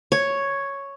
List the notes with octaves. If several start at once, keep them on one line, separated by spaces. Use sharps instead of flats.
C#5